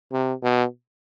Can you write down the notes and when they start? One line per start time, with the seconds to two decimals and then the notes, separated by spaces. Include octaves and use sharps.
0.12 C3
0.43 B2